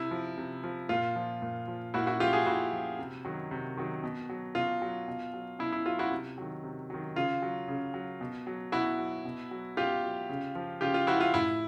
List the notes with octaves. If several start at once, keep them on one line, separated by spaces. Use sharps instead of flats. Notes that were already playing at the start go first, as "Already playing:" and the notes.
Already playing: C3 E4
F3
C3
F3
A#2 F4
F3
A#2
F3
A#2 E4 F#4
E4 F#4
F3 F4 G4
F#4 G#4
A#2 E4 F#4
F3
C3
D#3 F#3
C3
D#3 F#3
B2
F#3
B2 F4
F#3
B2
F#3
B2 E4
E4
F#3 F4
E4 F#4
C3
D#3 F#3
C3
D#3 F#3
C#3 F4
F#3
C#3
F#3
B2
F#3
B2 E4 F#4
F#3
B2
F#3
B2 F4 G4
F#3
C#3
F3
C#3 F4 G4
F4
F3 E4 F#4
F4
A2 E4